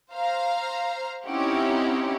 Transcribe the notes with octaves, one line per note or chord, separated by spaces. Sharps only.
C5 F5 A#5
C4 C#4 D#4 E4 G4 F#5